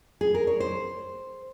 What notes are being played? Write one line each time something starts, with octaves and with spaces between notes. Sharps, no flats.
G#4
A#4
C#5
C5